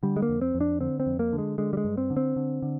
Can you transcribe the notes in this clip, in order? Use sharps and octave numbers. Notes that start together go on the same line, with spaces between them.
D3 G3
G#3
A#3
F2
C4
F2
D4
D3 C4
C4
F2
A#3
D3
G#3
D3 G#3
G3
G#3
G2
C4
D3
C4
D3
D3